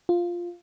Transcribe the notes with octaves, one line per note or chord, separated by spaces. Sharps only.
F4